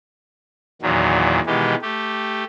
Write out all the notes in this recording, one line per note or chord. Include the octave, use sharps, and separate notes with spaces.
E2 A#2 D#3 F#3
B2 D#3 E3 G#3 G4
A3 G4